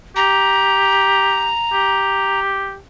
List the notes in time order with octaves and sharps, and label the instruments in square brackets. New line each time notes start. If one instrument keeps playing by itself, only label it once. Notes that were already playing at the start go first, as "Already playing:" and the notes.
[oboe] G4 [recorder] A#5
[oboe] G4